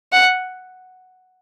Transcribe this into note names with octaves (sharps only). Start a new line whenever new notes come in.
F#5